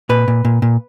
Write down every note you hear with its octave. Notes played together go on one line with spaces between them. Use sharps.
A#2 B4
A#2
A#2
A#2